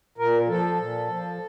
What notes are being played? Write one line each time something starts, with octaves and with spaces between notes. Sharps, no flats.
A#2 A#4
F3 A4
A#2
F3